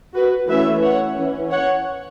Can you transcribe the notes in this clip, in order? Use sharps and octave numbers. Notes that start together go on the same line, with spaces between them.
F#4 B4
E3 A3 C#4 B4 E5
C#5 F#5
E3 C#4
C#5 F#5